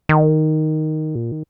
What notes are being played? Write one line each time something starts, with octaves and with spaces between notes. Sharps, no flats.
D#3
A#2
D#3